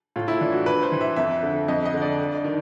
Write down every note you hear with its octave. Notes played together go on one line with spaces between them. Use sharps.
A2 F4
E4
E3 D4
F#4
G2 B4
C5
E3
E5
F2 E5
D3
F2 D#5
D#5
D3
D5
G2
D#3